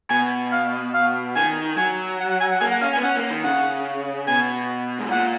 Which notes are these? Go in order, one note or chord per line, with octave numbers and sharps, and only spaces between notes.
B2 G#5
F5
F5
D#3 G#5
F#3 G#5
F#5
F#5
G#5
F#5
A#3 G#5
F#5
C#4 F5
G#5
B3
C#4 F#5
A#3
D#3
C#3 F#5
B2 G#5
G#2
A#2 F#5